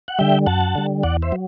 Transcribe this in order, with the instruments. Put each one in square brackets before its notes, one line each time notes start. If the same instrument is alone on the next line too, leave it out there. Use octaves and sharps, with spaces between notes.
[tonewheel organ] F#5
D3 G3 E5 G5
F#2 F#5 A5
D3 G3
E2 D5 F#5
C5 E5
F#3